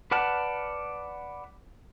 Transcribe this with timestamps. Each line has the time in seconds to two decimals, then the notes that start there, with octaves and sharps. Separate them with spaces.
0.11 B4 D5 F#5 A5 F6